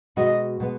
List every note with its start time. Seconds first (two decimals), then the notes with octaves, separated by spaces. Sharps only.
0.17 B2 G#3 B3 F#4 D#5
0.60 B2 G#3 B3